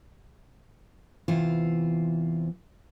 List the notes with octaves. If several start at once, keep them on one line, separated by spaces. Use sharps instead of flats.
E2 C3 E3 F4 C5 F5